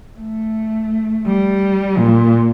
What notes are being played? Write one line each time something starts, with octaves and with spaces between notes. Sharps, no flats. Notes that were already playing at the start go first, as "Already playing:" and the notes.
A3
G3
A#2